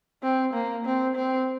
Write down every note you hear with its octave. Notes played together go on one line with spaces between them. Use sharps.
C4
A#3
C4
C4